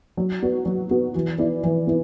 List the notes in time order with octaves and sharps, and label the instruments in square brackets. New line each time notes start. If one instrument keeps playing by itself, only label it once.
[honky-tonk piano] F#3
B3 F#4
F#3
B3 F#4
E3
B3 E4 B4 D5
E3
B3 E4